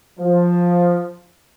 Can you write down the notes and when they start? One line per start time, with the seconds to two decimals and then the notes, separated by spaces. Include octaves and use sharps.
0.19 F3